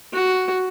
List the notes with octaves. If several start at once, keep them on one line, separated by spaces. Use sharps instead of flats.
F#4